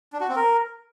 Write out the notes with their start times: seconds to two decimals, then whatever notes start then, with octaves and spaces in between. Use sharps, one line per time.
0.13 D4
0.21 F#4
0.28 C4
0.36 A#4